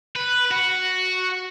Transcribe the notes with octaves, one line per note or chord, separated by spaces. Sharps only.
B4
F#4